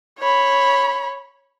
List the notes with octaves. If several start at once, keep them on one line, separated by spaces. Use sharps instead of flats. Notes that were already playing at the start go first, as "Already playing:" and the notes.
C#5 B5